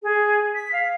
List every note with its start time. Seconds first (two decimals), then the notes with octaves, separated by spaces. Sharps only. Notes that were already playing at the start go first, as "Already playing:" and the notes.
0.02 G#4
0.55 B6
0.72 F5